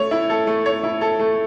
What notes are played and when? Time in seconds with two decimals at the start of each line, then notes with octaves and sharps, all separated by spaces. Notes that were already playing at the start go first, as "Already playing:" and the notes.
Already playing: A3 C#5
0.11 E4
0.30 A4
0.47 A3
0.66 C#5
0.83 E4
1.01 A4
1.19 A3